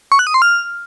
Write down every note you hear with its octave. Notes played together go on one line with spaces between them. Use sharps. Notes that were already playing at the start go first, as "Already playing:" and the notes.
C#6
F#6
D#6
C6
F6